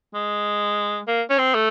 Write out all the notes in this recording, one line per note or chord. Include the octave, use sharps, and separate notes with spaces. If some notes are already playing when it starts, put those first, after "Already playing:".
G#3
A#3
C#4
C4
A3